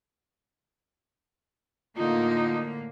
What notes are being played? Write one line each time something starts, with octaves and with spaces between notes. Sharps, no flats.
A2 D3 A#3 D#4 F4